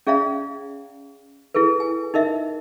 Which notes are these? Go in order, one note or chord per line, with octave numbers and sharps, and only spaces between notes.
C#4 G#4 D5 E5 F5 A#5
E4 G#4 A4 B4
G#5
D#4 A#4 D#5 E5